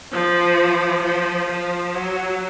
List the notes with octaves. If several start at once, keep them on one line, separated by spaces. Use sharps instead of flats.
F3
F3
F3
F#3